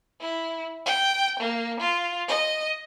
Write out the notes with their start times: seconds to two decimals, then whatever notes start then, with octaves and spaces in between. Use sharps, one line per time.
0.20 E4
0.86 G5
1.39 A#3
1.80 F4
2.28 D#5